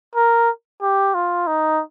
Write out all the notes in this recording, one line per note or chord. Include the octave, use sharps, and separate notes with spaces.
A#4
G4
F4
D#4